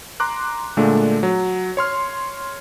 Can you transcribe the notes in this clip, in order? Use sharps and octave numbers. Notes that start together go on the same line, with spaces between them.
A#5 C6 D6 F#6
A#2 D3 G#3 A3 D4
F#3
C#5 C6 F6